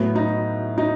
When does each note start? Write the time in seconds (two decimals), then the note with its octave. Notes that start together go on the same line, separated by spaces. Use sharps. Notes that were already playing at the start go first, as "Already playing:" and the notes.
Already playing: A2 F#3 B3
0.15 D#4
0.78 D#4